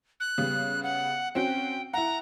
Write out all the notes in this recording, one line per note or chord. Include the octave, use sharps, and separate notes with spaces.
F#6
C#3 G3 B3
F#5
C4 C#4 F#4 G5
E4 F#5 A#5